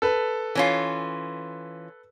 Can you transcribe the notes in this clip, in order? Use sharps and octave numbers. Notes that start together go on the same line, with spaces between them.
A4 B4
E3 C#4 F4